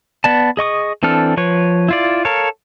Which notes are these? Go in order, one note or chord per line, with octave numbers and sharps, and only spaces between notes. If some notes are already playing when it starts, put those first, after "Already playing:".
B3 D5 A5
G#4 D#5 C#6 D#6
E3 C4 D4 A4 F6
F3 B4 C#5 C#6
E4 F4 D5
A4 A#4 C#5 F5